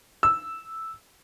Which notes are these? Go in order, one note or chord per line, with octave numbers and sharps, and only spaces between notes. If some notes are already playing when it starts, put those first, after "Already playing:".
E6